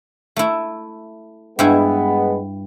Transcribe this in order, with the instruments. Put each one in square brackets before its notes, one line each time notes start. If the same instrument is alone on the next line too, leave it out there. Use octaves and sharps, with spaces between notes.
[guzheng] A3 E4
[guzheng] G2 E4 G#5 [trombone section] G#3 B3